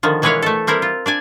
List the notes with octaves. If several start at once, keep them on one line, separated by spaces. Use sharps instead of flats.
D3 D#3 F3
B2 E3 G#3 B4 C#5 F5
A3 A4
G3 C4 E4 A#4
F4
D4 D5 G#5